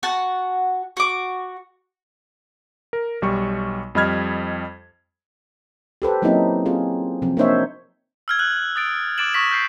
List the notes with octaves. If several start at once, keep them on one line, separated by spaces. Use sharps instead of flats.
F#4 F#5 A5
F#4 D6
A#4
B1 G3 C#6
F2 G3 D#5 B5 F6 G#6
G4 A4 B4 C5
F#3 A#3 C4 C#4 D#4 E4
C4 F4 G#4
C3 F3 C4
A#3 D4 D#4 C5 C#5 E5
E6 F6 G#6
F#6 F#7
D#6 A6 D7
D6 F#6 A6 D7 E7 F#7
C#6 D#6 A#6 B6 E7 F#7
F6 G6 B6 C7